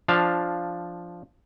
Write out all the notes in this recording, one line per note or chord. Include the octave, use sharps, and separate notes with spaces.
F3 D4 F5